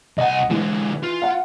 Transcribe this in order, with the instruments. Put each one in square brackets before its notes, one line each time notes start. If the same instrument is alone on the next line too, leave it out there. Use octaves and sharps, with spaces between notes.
[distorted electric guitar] C2 G#5 [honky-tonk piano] D#5 F#5
[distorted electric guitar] D3 G#3 [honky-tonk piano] E3
[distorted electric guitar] F4
[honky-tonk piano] F5 F#5